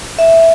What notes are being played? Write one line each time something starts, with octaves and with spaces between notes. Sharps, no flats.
E5